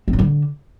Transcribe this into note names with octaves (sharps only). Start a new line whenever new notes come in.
C4
F#3
D3